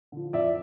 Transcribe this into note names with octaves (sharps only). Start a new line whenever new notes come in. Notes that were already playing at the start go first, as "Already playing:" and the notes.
D3 F3
F2 D5 E5